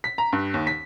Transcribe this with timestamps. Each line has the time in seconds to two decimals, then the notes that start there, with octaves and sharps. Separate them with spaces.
0.04 B6
0.18 A#5
0.33 G2
0.54 D#2
0.67 B6